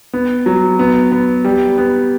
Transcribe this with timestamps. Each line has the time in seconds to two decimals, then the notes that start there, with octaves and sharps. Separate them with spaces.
0.13 B3
0.46 F#3
0.79 B3
1.11 B3
1.44 G3
1.78 B3